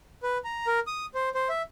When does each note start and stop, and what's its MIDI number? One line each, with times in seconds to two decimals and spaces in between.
0.23 0.38 71
0.45 0.67 82
0.67 0.80 70
0.87 1.06 87
1.15 1.29 72
1.35 1.48 72
1.49 1.62 76